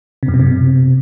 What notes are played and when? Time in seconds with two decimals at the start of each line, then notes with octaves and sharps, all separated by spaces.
0.23 C3
0.28 F#2
0.34 B2
0.40 C3